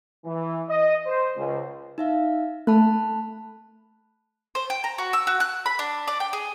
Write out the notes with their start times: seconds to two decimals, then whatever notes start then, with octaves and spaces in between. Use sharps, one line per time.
0.25 E3
0.68 D#5
1.06 C5
1.37 C#2
1.98 D#4 E5 F5
2.67 A3 A5 B5 F#6
4.55 C5
4.70 G5
4.84 A#5
4.98 F#4
5.13 E6
5.27 F#4
5.40 F#6
5.66 B5
5.79 D4
6.08 D5
6.20 G5
6.33 G#4